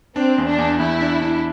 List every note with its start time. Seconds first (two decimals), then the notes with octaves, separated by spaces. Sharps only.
0.16 C4 D4
0.38 E2
0.48 D4
0.58 E2
0.80 E2 E4
1.01 D4
1.22 D4